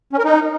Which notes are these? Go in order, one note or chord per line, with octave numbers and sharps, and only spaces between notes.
C#4
A#4
D#4